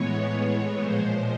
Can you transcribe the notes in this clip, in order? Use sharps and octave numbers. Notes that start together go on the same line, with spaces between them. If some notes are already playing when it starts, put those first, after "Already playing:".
Already playing: A2 E3 G#3 B3 C#5
C#5
A#2 F3 G#3 C5